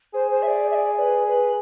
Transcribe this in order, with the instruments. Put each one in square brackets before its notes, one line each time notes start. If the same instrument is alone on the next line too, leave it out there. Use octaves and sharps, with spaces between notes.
[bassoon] G#4 [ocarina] C5
[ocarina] C5
E5
D5
E5
D5
B4
B4